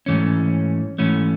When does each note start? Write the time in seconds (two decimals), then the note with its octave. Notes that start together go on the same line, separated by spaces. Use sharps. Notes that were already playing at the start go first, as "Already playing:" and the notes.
0.06 G#2 E3 A3 C#4
0.98 G#2 E3 A3 C#4